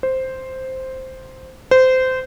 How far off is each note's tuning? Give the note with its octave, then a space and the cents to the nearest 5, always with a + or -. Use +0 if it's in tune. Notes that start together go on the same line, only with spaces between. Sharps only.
C5 +0
C5 -20